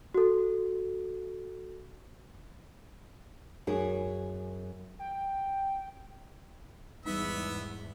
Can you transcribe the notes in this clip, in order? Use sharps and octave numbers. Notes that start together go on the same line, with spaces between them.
F#4 A4
F#2 G#4
G5
E2 G#2 G3 B3 D#4 E5